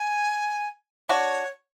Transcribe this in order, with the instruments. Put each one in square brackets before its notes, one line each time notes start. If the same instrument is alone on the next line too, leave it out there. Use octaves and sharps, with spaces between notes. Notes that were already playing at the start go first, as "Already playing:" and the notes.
Already playing: [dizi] G#5
[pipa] D4 F#4 [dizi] C#5